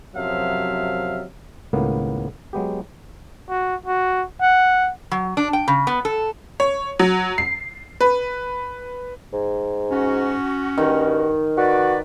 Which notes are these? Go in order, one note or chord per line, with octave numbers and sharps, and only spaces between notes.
F#2 C3 F3 F#3 E5 F5
C#2 A2 D#3 A#3 B3
F#3 G#3 B3 G4
F#4
F#4
F#5
F#3
D4
G5
C#3
B3
A4
C#5
F#3
C7
B4
G#2
C#4 F#4
G2 D#3
F#4 B4 D5